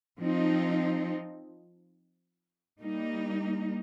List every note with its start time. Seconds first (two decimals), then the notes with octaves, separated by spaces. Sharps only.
0.19 F3 C4 D#4
2.79 G3 A#3 D#4